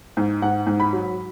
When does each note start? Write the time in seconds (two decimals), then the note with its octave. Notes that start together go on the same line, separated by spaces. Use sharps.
0.17 G#2
0.42 G#2 F#5
0.67 G#2
0.80 B5
0.93 F#3